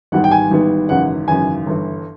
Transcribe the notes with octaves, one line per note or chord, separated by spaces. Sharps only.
G#1 G#2 E3 G3 B3 F#5
G5
G#5
G#1 G#2 E3 G3 B3
G#1 F#2 C#3 E3 F#5
G#1 F#2 C#3 E3 G#5
G1 G2 E3